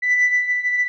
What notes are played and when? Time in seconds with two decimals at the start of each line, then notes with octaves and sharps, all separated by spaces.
0.02 B6